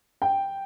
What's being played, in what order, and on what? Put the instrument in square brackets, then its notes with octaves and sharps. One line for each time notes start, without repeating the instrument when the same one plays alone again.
[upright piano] G5